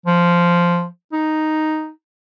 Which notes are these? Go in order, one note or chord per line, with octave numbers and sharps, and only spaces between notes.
F3
D#4